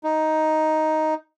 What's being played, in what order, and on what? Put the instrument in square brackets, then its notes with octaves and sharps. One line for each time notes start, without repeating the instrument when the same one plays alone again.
[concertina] D#4